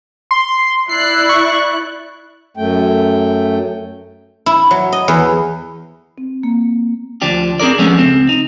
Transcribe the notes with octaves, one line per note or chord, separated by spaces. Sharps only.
C6
E4 D5 F#6 C7
C#6
F#2 A3 G5
E4
F#3
D#5
E2
C4
A#3
D2 F3 D4 G4
C4 D4 G#4 A#4 D5
F3 G#3 A3 B3 C#4 G4
C#2 C4
D#4